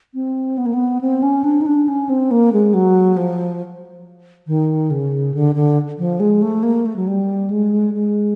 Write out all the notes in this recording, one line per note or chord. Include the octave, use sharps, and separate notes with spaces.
C4
B3
A#3
B3
C4
C#4
D4
D#4
D4
C#4
C4
A#3
G#3
F#3
F3
D#3
C#3
D3
D3
F3
G#3
A3
A#3
A3
F#3
G3
G#3
G#3